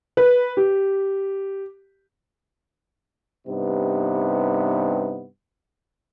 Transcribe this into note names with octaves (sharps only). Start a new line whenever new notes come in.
B4
G4
G2 C3 B3 D#4